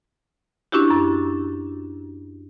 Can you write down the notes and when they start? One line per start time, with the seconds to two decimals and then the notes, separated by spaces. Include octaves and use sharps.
0.72 C#4 D4 E4 F#4 G4
0.90 F#2 A6